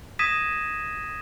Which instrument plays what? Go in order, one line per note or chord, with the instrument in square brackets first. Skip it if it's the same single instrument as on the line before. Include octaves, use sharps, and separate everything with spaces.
[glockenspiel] D#6 G#6 A#6 B6 D#7 E7